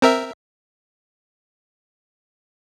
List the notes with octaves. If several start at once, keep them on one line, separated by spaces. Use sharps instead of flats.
C4 A#4 E5